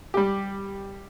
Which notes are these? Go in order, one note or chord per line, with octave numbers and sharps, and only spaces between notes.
G3 G4